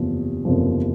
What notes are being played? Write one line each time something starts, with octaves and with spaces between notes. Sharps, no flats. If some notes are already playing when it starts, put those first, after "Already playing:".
Already playing: F#1 E2 C3 F3
F#1 E2 C3 F3